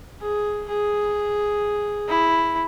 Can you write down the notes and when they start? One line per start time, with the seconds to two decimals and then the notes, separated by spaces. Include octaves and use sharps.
0.21 G#4
0.68 G#4
2.08 E4